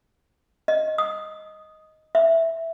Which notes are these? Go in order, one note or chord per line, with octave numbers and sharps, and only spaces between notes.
D#5
D#6
E5